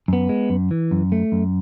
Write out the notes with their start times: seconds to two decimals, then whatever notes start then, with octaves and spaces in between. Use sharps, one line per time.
0.08 F#2 B3
0.29 G#3
0.50 F#2
0.71 E3
0.91 F#2
1.12 A3
1.32 F#2